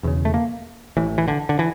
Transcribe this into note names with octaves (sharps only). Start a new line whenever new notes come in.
E1 E2 C#3
A3
A#3
A1 A2 E3
E3
D3
D3
E3